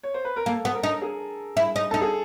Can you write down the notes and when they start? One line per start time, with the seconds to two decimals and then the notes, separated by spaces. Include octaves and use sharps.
0.03 C#5
0.14 C5
0.25 B4
0.36 A#4
0.46 A#3 A4
0.65 B3
0.74 A#4
0.83 D#4
1.02 G#4
1.57 E4
1.76 D#4
1.91 D#4 A4
2.01 G#4